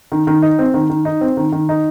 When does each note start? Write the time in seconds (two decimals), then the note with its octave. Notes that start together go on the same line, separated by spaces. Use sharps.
0.12 D#3
0.27 D#3
0.42 D#4
0.59 C4
0.74 D#3
0.90 D#3
1.05 D#4
1.21 C4
1.37 D#3
1.52 D#3
1.69 D#4